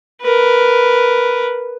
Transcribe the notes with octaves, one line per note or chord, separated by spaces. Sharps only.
A#4 B4